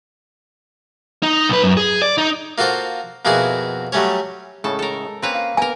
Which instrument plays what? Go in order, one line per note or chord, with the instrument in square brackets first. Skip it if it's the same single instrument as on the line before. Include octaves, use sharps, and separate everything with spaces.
[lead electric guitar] D#4
B1 B4
F#2
G#4
D5
D#4
[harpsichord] A#3 F4 F#4 A4 C5
F2 B2 A#3 E4 F#4 G#4
F#3 G3 A3 C#4 C#5
[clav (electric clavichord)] A2 C#3 [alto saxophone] G#3 [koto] A4
[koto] A4 A#4
[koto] A#3 B4 A#5 [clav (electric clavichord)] C4 C#4
[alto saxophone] F5
[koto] A#3 A#4 [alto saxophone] B3 [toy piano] G#5